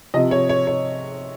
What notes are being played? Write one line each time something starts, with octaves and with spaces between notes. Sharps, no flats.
C3 F3 D#5
C#5
C#5
C#5